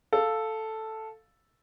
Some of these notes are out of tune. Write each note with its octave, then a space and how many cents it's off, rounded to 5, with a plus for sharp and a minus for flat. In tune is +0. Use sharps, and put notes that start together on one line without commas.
A4 +0 F5 +0